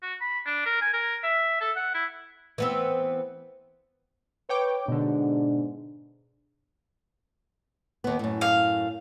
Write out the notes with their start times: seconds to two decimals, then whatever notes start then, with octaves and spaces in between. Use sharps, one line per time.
0.03 F#4
0.21 B5
0.46 D4
0.66 A#4
0.82 G#5
0.94 A#4
1.24 E5
1.61 A4
1.76 F#5
1.95 E4
2.58 E3 B3 C4
4.49 B4 C#5 G5 D6
4.88 G#2 B2 D3 D4
8.04 D#2 B3
8.19 F#2 A2
8.41 F5